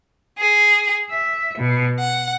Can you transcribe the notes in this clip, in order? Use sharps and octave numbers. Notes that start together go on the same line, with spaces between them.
G#4
E5
B2
F#5